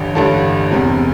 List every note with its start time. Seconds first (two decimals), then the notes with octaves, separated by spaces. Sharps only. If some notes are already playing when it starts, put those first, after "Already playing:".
Already playing: A1 G2 D3 G4
0.15 A1 G2 D3 A4
0.71 E1 E2 C3